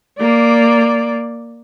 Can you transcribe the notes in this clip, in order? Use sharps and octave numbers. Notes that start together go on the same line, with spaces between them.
A#3 D5